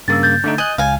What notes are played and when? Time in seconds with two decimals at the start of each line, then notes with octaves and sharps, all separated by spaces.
0.08 G2 C#3 A#3 E6 A6
0.23 G6 A6
0.44 D3 A3 D#4
0.58 D#5 G#5 F#6
0.78 C#2 F5 G#5